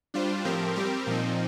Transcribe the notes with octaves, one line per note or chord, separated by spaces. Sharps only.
G3 D4 F4 C5
A2 F3 C4 G4 A#4
G3 C4 G4 A#4
A#2 F3 C4 D#4